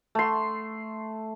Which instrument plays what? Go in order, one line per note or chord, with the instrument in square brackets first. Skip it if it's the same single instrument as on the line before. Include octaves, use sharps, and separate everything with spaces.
[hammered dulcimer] A3 C6